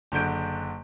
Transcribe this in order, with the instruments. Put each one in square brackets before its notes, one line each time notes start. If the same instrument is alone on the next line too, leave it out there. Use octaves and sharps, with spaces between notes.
[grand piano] F#1 D3 F#4 G6 D7